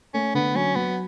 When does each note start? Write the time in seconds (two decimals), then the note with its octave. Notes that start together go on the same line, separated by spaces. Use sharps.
0.14 A3 C#4
0.34 D3 B3
0.55 F#3 C#4
0.75 F#3 B3